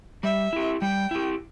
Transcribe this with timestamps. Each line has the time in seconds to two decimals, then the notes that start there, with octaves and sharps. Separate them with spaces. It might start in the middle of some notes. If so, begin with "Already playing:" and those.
0.23 G3 E5
0.53 E4 G4
0.82 G3 G5
1.11 E4 G4